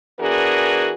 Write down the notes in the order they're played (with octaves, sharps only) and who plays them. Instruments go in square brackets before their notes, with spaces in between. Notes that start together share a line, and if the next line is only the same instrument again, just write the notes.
[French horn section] E3 B3 D4 F#4 G#4 A#4